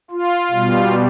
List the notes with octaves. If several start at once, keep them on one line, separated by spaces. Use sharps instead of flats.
F4
B2 G3